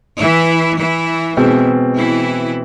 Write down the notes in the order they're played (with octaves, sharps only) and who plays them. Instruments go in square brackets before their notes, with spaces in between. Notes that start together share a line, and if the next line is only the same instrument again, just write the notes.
[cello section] E3 E4
E3 E4
[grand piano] B2 G#3 C4 [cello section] E3 E4
[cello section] E3 E4